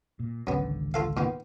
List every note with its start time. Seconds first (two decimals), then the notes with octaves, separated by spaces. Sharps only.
0.20 A#2
0.47 G#1 C#2 F#2 D3 B3
0.94 F4 A4 F5
1.17 A#2 D#3 B3